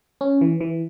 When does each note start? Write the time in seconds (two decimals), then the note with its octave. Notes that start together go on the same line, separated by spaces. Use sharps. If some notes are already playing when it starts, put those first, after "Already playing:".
0.21 C#4
0.41 E3
0.61 E3